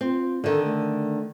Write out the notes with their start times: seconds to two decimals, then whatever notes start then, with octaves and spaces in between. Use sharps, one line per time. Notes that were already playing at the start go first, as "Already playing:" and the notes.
0.01 C4 F4
0.44 D3 D#3 A4
0.64 A3